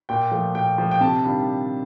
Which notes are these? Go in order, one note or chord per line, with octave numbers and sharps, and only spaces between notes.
A#2 G5
F3 A3
A#2 G5
F3 A3
G5
C3 A5
D#3 G3 D4 F4